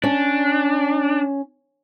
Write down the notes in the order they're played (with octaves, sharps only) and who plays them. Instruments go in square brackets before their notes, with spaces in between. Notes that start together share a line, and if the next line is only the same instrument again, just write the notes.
[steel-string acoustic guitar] C#4 [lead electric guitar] D4